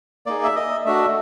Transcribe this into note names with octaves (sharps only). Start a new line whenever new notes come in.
A#3 D#4 G#4 D5
E5
D#5
A3 D4 F#4 E5